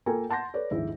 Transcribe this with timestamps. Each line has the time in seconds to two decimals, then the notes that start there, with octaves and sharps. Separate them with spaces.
0.06 A#3 F4 A4 A#4 G5 G#5
0.30 F#5 A5 C6 G6 A#6
0.54 A4 B4 C#5 D5
0.71 D#1 A#1 G#2 E4 G#4